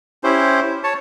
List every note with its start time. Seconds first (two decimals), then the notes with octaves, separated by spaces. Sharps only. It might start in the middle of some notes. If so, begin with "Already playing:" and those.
0.24 C#4 E4 G4 C5
0.84 C#5 A5